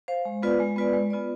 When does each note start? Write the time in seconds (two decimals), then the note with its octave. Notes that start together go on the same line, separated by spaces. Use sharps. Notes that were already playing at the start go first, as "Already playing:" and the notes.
0.08 C5 F5
0.25 G#3
0.43 B3 F4 B4 D5
0.60 G#3
0.76 B3 F4 B4 D5
0.93 G#3
1.10 B3 F4 B4 D5